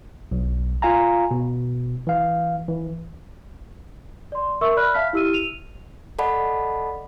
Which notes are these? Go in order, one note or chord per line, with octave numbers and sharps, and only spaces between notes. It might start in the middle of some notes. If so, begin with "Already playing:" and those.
B1
F4 F5 G#5 A#5
B2
E3 F5
E3
D5 C6
A#4 E5 C#6 E6
D5 B5 F6 F#6
E5 F5 A5 F6 B6
E4 G4 E6 F6 D#7
D#7 F7
A4 D5 D#5 F#5 A5 B5